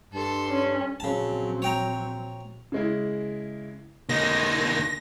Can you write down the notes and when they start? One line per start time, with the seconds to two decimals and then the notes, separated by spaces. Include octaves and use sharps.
0.14 G2 A4 C6
0.49 C#4
1.00 A#1 C#3 F#3 C4 A5
1.62 C#5 G5 A#5
2.72 C#3 G#3 E4
4.09 D3 A#3 D#5 A#6